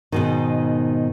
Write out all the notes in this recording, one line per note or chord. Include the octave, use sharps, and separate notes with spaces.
G#2 B2 D#3